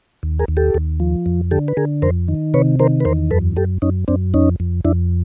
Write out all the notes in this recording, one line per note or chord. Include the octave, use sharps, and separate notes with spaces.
D#2
G#4 A#4
D#2
G4 A4
D#2
F3
F2
D3 G4 A4
B4
D3 G#4 A#4
F2 A#4 C5
D#3
C3 B4 C#5
D#3 A#4 C5
B4
E2 A#4 C5
F#2 A4 B4
F#2 G4 A4
F#2 C#4 D#4
F#2 C4 D4
F2 C#4 D#4
F2
F2 D4 E4